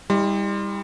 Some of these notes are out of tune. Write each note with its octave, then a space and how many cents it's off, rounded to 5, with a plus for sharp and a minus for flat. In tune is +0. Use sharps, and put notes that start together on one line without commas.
G3 +25 E4 -45 C6 +0